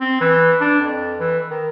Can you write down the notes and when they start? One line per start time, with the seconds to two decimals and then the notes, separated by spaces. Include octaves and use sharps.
0.01 C4
0.21 E3
0.61 D4
0.81 F2
1.20 E3
1.50 D#3